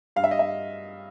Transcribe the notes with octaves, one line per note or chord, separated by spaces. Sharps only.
G2 F5
E5
D#5
E5